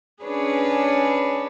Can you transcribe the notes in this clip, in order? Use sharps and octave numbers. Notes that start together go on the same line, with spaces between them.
C#4 D4 G#4 B4 C#5